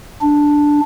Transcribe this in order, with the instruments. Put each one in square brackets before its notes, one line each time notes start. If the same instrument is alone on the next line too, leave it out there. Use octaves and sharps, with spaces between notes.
[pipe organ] D4